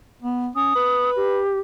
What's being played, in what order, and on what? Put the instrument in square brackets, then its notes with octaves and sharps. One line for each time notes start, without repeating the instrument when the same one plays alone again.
[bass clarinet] B3
[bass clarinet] C#4 [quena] D#6
[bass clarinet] B4
[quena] G4